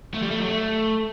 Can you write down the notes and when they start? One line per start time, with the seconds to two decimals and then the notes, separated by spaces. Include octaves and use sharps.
0.14 A3
0.23 G3
0.31 A3
0.40 F#3
0.48 A3